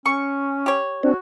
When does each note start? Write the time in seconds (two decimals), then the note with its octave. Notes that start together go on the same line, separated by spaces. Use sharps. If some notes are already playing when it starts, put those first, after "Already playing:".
0.06 C#4 C#6
0.66 G4 C#5
1.03 C4 D4 F#4